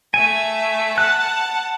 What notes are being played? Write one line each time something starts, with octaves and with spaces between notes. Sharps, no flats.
A3 E5 G#5
F#5 A5 F#6